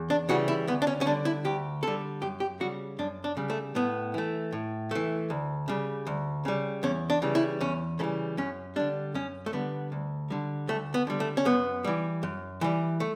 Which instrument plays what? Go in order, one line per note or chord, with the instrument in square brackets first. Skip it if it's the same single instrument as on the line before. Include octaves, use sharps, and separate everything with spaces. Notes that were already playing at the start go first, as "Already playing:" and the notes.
Already playing: [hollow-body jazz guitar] E2
D4
C#3 E3 G3 F#4
E4
D2 B3
D4
C#4
C#4
D3 G3 D4
E4
D2 G4
D3 G3 A4
F#2 G4
G4
C#3 G3 F#4
F#2 D4
D4
C#3 G3
A3
A2 B3
E3 A3
A2
E3 A3
D2
C#3 G3
D2
C#3 G3
E2 C#4
D4
C#3 E3 G3
E4
E2 C#4
C#3 E3 G3 A3
F#2 C#4
D3 G3 D4
F#2 C#4
A3
D3 G3 B3
D2
D3 G3
D2 A3
B3
D3 G3
A3
C#4
F#2 B3
E3 G3
F#2
E3 G3
A3